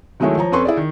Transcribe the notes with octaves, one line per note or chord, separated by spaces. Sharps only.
D#3 F#3 G#3 A3 E4 C#5
F3 C#5 A#5
F2 C#4 A4 B4 C6 C#6
E4 G#4 D5
D#3